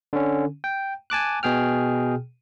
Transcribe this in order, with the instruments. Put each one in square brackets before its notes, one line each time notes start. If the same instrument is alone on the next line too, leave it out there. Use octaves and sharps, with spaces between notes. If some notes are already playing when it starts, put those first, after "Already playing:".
[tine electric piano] D3 C#4
G5
G#5 A5 D6 F#6
B2 G#4 G5 F6